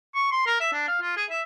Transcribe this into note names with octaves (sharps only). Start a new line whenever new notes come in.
C#6
C6
A#4
E5
D4
F5
F4
G#4
E5